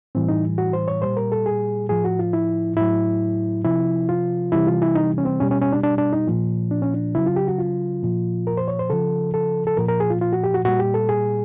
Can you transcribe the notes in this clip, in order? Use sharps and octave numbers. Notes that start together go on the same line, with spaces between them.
A2 E3 G3 C4
D#4
F#4
C5
C#5
A#2 G3 C5
A#4
A4
G#4
A2 F3 G#4
F#4
F4
E4
A2 F#3 E4
C3 F3 E4
F4
C3 E3 G3 E4
F4
E4
D#4
C#4
C4
B2 G3 C#4
C#4
C#4
D4
D4
D4
D#4
A#2 F3
D4
C#4
D4
C#3 F#3 E4
F4
G4
F#4
F4
A#2 F3
A#4
C5
C#5
C5
C#3 F3 A4
A4
A4
A#2 F3 A#4
A#4
G#4
F4
F4
F#4
G4
F#4
A#2 G3 F#4
G4
A4
G#4